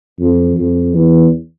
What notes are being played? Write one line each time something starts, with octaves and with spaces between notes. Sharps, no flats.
F2
F2
E2